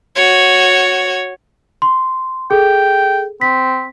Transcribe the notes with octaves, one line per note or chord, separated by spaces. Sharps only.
F#4 C#5
C6
G#4 A4 G5
C4 B6